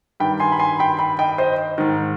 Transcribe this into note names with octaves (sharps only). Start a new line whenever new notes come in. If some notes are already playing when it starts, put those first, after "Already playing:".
G2 D#3 G5 B5
G#5 C6
B5
G#5 C6
G5 B5
G5 B5
D#5 G5
C5 D#5
G#2 D#3